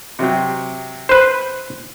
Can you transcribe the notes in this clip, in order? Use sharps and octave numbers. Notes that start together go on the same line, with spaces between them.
C3 F#3 C4
B4 C5